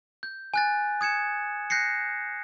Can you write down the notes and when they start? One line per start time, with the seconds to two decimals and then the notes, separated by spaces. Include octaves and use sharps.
0.23 G6
0.54 G#5 F#6 A6
1.01 D#6 G#6 C#7 E7
1.70 F#6 G6 A#6 C7 C#7